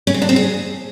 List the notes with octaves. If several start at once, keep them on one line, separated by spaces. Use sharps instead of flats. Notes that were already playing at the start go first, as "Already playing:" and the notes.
C#4
C4
D4
C4
G#4